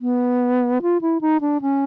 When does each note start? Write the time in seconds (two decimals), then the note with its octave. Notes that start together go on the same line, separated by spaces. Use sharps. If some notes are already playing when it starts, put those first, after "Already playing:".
0.01 B3
0.82 F4
1.01 E4
1.21 D#4
1.41 D4
1.62 C#4